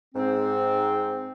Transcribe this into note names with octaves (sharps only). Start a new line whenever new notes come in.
G#2 C4